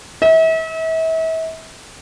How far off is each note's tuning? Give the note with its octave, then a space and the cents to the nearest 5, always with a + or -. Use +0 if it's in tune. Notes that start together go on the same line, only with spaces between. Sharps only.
E5 -35